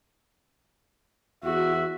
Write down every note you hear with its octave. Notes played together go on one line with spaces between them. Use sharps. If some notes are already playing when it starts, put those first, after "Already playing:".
E2 F#4 E5